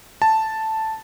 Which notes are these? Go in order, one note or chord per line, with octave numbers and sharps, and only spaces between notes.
A5